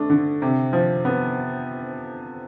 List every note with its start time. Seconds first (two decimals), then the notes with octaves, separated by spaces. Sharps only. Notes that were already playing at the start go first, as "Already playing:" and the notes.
Already playing: A3 D4
0.10 D3
0.42 C3
0.73 F3
1.05 B3